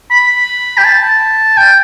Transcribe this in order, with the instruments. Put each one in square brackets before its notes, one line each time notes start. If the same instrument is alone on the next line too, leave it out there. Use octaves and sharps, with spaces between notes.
[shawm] B5
G5
A5
G5